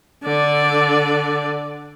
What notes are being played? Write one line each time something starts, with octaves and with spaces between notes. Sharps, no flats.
D3 D5